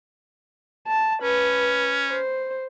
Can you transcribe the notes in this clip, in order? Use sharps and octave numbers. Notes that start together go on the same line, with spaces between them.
A5
C#4 B4
C5